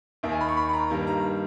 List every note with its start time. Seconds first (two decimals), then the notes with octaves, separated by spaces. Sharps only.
0.23 D#2 D#3 A#3 E5
0.32 G#5
0.40 B5
0.48 C#6
0.57 B5
0.69 B5
0.73 A#5
0.90 G2 D#3 G3 A#3
1.07 A#5